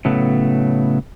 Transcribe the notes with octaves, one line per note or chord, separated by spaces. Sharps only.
A2 C#3 F#3 A3 B3